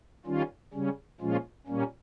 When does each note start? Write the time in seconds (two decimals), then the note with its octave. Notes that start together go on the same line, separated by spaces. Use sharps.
0.26 D#3 G3 C#4 F4
0.73 C#3 G3 C#4
1.20 A#2 F3 G#3 C#4 F4
1.67 A#2 G3 A#3 C#4